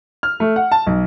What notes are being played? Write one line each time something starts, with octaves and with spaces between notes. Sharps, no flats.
F6
A3
F#5
A5
B1